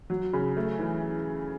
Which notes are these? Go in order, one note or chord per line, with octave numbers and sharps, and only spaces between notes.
F#3
C#3
A3
E3